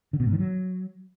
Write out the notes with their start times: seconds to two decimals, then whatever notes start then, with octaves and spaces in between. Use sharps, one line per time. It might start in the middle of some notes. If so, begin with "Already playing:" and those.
0.13 D3
0.20 B2
0.26 G#2
0.33 D#3
0.39 F#3